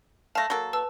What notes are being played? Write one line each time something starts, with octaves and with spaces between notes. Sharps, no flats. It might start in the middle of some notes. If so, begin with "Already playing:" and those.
A3 F5 A5 A#6
F#3 A#3 A4
B4 A5 E6